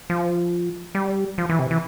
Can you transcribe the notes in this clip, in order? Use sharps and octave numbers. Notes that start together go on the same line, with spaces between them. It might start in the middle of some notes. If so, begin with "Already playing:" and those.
F3
G3
F3
E3
C3
E3